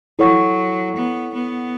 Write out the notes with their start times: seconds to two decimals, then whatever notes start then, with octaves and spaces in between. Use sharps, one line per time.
0.19 F#3 E4 A4 C#5 F#5 C#6
0.96 B3
1.34 B3